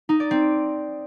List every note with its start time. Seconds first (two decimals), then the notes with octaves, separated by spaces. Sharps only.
0.09 D#4
0.20 D5
0.31 C4